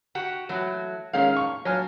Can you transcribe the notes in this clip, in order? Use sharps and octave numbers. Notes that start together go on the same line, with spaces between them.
F#4 G4 F#5
E3 F#3 A3 F#4
A#2 D#3 G#3 C#4 F5
C#6
F#3 F4 G#5 F6